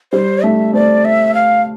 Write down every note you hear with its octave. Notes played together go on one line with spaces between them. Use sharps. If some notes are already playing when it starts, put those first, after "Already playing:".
G3 C5
A3 E5
A3 C4 D5
E5
F5